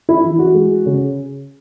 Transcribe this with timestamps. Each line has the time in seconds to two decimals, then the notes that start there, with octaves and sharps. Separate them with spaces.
0.09 E4
0.24 E3
0.39 F#4
0.54 G#3
0.86 C#3